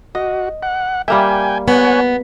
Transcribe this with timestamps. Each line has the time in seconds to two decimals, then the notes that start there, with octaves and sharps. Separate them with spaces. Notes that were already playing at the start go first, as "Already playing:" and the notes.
0.15 F#4 D#5
0.63 F#5
1.08 G3 A#3 E5 G5 G#5
1.68 B3 C#5 F#5 G#5